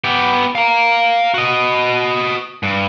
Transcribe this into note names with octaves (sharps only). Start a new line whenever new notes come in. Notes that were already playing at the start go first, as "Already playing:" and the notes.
B3 G4
F5 A#5
F#4 D#5
G2